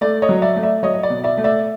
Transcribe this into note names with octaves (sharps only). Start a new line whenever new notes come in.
A3 D5
C#5 D#5
F#3
D5 E5
A3
D5 E5
F#3 C#5 D#5
D#5
D5
B2
D5 E5
A3
D5 E5